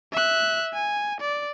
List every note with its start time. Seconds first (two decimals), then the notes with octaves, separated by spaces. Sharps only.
0.12 E5 F#6
0.73 G#5
1.20 D5